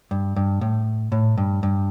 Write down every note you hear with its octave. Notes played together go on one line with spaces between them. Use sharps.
G2
G2
A2
A2
G2
G2